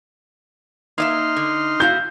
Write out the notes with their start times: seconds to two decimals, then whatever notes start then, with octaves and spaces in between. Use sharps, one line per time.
0.98 A#3 D#4 D#5 E5 C6 F6
1.37 D3
1.80 E4 F#4 F5 G6